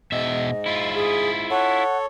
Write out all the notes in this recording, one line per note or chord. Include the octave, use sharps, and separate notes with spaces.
G#2 B2 D#5 E5
E4 F4
G#4
A4 C#5 F#5